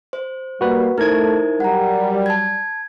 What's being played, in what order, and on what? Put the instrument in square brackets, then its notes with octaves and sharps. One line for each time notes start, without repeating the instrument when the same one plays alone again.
[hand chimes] C5
[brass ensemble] G3 A#3 [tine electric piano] F#4 B4
[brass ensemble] A3 [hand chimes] D#4 E4 C5 [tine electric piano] A#4 G#6
[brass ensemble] F#3 G3 [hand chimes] F#5 A#5
[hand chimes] A5 G#6